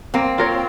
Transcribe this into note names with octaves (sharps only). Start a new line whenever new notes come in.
A#3 C4
F4 A#4 C#5